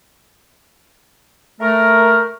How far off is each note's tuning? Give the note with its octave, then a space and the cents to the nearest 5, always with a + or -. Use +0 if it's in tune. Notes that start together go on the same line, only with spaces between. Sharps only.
A3 +10 A#4 +5